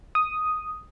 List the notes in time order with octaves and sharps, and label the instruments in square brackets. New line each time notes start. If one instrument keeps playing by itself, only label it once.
[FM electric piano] D#6